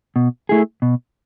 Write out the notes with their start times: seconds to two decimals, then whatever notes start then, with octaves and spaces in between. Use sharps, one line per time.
0.16 B2
0.49 A3 E4 G#4
0.82 B2